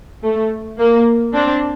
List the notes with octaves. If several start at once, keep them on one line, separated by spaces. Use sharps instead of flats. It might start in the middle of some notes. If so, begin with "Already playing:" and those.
A3
A#3
C4 D4